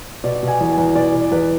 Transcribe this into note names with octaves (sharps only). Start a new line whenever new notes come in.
B2 D5
B2 G#5
E2
G#5
E2
B2 D5
B2
E2 B4